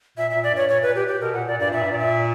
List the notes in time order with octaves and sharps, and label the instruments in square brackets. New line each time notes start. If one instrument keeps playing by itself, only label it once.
[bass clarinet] A#2 [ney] E5
[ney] E5
[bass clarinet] A#2
[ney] D5
[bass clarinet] G2 [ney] C#5
[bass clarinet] A#2 [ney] C#5
[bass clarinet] A#2 [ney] B4
[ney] G4
G4
[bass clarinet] B2 [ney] A#4
[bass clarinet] A#2 [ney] F#5
[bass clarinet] A#2 [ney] D5
[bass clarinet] G2 [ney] D5
[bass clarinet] A#2 [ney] E5
[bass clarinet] G2
[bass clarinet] A#2 [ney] D5
[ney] E5